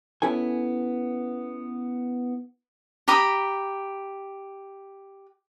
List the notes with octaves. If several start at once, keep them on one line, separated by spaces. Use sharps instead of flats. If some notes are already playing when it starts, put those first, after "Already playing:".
B3 C#4 E4 A4 G#5
G4 A#5 B5 D#6